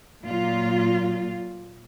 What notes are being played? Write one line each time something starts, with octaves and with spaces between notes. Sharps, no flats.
A#2 F#3 F4